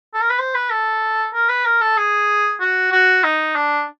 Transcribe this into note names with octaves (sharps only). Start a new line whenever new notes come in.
A4
A#4
B4
C5
B4
A4
A#4
B4
A#4
A4
G#4
F#4
F#4
D#4
D4